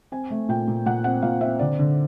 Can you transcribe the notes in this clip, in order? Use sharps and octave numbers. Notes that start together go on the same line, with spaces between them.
C4 G#5
A3
A#2 G5
A#2
A#2 F#5
C4 F#5
A#2 F5
C4 E5
D3 D5
D3